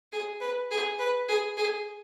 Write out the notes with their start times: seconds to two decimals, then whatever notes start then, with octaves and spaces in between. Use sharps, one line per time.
0.12 G#4
0.41 B4
0.71 G#4
0.99 B4
1.29 G#4
1.57 G#4